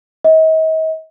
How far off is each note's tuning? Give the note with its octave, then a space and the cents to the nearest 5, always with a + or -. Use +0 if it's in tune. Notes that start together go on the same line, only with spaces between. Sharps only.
D#5 +40